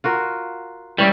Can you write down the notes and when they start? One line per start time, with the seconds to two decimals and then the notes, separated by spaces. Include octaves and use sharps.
0.04 F4 F#4 A#4
0.98 E3 G3 C#4 E4